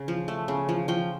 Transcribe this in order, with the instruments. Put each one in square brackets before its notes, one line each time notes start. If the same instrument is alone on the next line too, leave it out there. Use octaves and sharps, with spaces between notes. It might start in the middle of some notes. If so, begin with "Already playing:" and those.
Already playing: [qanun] C#3
F3
A3
C#3
F3
F3 G5